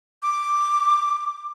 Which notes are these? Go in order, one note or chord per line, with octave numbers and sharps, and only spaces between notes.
D6